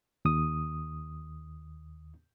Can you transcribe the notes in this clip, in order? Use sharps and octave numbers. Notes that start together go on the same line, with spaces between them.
D#2 D#6